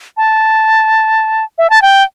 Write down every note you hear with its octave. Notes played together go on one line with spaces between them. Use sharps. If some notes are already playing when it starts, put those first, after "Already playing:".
A5
E5
A5
G5